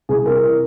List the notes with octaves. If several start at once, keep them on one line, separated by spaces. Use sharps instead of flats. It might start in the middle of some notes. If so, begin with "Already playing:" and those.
C2 G#4
C3 A#4
E3